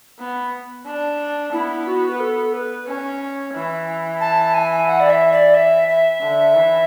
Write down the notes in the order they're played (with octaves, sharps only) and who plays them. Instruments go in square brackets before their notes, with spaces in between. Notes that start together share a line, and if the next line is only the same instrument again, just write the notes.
[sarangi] B3
D4
[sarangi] B3 [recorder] E4
[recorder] F#4
B4
A4
B4
[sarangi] C#4
E3
[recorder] A5
G#5
F#5
D5
E5
D5
E5
E5
[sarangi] D3
E3